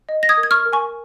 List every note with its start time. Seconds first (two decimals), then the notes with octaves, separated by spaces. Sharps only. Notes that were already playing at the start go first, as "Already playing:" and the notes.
0.09 D#5
0.23 A#6
0.29 D#6 G#6
0.37 A#4
0.43 G#6
0.51 C#6 F6
0.66 A#4
0.73 G#5 C#6